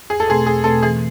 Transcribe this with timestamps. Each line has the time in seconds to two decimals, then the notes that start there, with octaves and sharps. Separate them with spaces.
0.10 E2 G#4
0.20 A4
0.28 B2 A3 C4 G#4
0.47 E2 G#4
0.64 B2 A3 C4 A4
0.82 E3 G#4